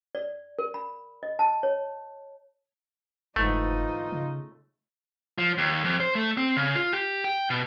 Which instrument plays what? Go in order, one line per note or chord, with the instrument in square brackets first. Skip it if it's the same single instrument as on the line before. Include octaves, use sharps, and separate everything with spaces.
[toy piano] D5
A#4
B5
D#5
A5
C#5
[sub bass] F#1 [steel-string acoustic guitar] D2 G#2 E3 [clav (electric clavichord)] A3 [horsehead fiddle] D#4 F4
[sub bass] C#3
[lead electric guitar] F3
D#2
F2
C5
A3
C4
C#3
F4
G4
G5
B2